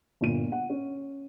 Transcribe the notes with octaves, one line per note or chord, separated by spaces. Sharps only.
G1 A#2 D#7
F#5
C#4